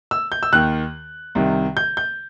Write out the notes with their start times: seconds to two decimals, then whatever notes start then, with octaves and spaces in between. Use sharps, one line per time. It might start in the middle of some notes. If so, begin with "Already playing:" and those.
0.11 E6
0.32 G6
0.43 E6
0.52 D#2 D#3 F#6
1.35 C2 C3 D#3
1.77 G6
1.97 G6